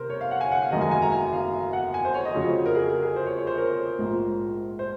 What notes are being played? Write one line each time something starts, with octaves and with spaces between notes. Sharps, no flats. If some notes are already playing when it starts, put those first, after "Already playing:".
Already playing: C3 A#4 C5
C#5
F5
F#5
G#5
F#5
F5
F#1 F#2 D#3 G#3 D#5
G#5
G#5
A#5
G#5
F5
F#5
G#5
C5
C#5
D#5
F2 C#3 F#3
A#4
G#4
A#4
G#4
C5
C#5
C#5
C5
A#4
A#1 G#2 F3
C5